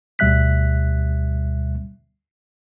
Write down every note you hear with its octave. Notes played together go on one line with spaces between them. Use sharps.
D2 B2 G3 E5 F#6 B6